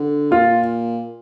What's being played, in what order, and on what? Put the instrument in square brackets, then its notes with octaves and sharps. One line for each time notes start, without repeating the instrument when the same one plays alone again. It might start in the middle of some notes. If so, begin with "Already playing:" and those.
Already playing: [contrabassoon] D3
[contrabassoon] A#2 [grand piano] F4